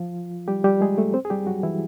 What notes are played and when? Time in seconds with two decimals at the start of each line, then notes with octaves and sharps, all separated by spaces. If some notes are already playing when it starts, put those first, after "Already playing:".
Already playing: F3 F4
0.48 G3 G4
0.64 G3 G4
0.81 G#3 G#4
0.98 A3 A4
1.14 C4 C5
1.25 G#4
1.30 G3 G4
1.47 F#3 F#4
1.63 E3 E4